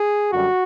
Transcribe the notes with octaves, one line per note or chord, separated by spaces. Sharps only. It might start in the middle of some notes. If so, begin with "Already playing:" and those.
Already playing: G#4
F#2 D3 G3 F#4